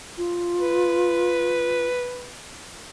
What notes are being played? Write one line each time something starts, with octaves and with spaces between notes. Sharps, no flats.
F4
B4